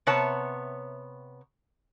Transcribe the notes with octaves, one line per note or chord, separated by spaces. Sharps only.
C3 B3 C#5 A5